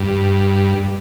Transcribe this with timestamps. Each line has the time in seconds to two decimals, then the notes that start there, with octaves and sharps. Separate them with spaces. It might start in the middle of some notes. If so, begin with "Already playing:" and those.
Already playing: G2